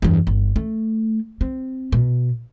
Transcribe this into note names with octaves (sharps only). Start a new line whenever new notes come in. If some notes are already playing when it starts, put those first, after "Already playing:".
E2 G2
G1
A3
C4
B2